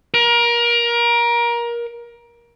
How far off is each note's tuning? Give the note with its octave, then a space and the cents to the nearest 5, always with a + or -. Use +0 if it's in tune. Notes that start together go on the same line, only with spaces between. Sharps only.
A#4 +25